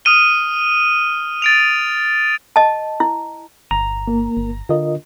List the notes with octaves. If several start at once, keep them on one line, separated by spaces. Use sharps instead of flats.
D#6 F6 D#7 G7
A6 D7 F7
D#5 A5
E4
G1 A#5
A#3 A#4
G1
D3 F4 A#4 D#5